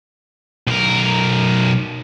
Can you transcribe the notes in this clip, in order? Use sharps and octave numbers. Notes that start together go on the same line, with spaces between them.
B1 A#4